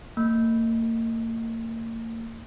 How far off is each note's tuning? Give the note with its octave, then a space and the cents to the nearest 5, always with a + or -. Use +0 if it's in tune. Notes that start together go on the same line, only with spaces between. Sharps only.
A#3 -40